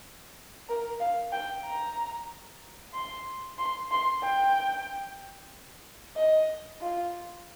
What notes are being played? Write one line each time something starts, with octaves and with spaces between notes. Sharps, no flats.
A#4
F5
G5
A#5
C6
C6
C6
G5
D#5
F4